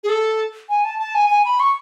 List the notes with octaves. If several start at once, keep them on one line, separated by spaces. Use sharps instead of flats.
G#4
A4
G#5
A5
A5
G#5
G#5
B5
C#6